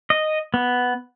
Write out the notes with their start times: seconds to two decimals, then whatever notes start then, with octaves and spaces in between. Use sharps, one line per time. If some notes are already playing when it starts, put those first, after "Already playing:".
0.10 D#5
0.54 B3